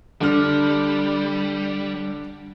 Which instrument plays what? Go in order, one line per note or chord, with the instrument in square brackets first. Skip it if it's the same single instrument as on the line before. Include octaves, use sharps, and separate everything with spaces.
[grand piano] D3 D4 F6 [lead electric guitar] G3